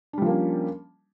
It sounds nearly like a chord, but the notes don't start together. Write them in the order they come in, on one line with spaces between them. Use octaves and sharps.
D4 G3 F3 A#3 C#4